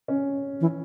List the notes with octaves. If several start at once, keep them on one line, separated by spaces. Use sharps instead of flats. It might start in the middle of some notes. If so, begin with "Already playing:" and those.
C#4
E3